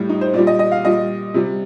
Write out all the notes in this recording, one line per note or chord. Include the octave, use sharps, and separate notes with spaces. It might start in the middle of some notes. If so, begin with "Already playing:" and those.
Already playing: A2 G3
D#4
C5
A#2 G3 D5
D#5
D#5
F5
A#2 G3 D#5
C3 G3